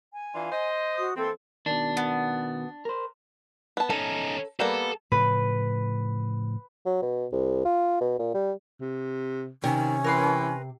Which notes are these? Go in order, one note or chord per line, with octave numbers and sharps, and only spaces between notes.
G#5
E3 D4 F4
C5 D#5
F#4 D#6
E3 A#3 C4 A4 C6
B2 D#3 D4
B3
A#4 C5
B3 A5
C#4 D#4 A4
G3 A#3 B3 A4
A2 C#3 F3 B4
F#3
B2
C2
F4
B2
A#2
G3
C3
C3 D#3 C#4
E3 A#4 B4 C6